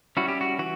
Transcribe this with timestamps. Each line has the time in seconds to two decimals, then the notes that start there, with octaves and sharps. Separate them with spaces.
0.17 G3 C#4 E4 F#4
0.28 G4
0.41 F#4
0.59 E3 F#4